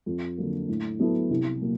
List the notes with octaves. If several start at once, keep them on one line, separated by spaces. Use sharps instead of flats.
F2
D3 F#3 A#3
A2
F#3 B3 E4 A4
C2
A#2 F#3 A#3